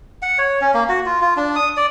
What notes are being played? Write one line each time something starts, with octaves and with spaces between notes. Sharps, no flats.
F#5
C#5
C#4
A#3
F#4
F4
F4
D4
D#6
D5